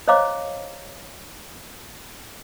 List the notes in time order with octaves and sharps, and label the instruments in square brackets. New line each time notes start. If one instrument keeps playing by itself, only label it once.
[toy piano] C5 C#5 D#5 F5 A#5 D6